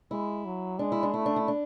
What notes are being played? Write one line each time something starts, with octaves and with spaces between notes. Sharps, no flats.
G#3 E4
F#3
G#3 D4
E4
D4
A3 E4
D4
E4
D4